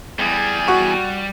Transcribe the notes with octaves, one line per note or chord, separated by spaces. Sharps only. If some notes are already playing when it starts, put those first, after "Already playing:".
E2 G3 G#4
F#4 C#6